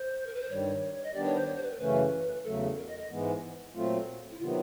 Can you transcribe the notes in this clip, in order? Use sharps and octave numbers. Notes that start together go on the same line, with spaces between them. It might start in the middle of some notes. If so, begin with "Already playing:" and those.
Already playing: C5
A#4
B4
C5
G2 D#3 G3 C#5
D#5
D#3 G3 B3 D4 G4 D5
C#5
C5
C#5
C5
B4
A#4
F#2 C#3 E3 A3 C#4 B4
E2 C#3 F#3 A3 A4
A#4
D#5
D#5
G#2 E3 G#3 B3
A#2 F#3 A3 C4 F4
E4
C3 D#3 F#3 B3 F4